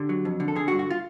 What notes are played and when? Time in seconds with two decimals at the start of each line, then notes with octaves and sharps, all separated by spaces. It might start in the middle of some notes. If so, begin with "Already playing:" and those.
Already playing: D3 G4
0.09 F#3
0.25 F2
0.40 D3
0.48 A4
0.56 D3 G#4
0.68 F#4
0.72 G2
0.79 F#4
0.90 F4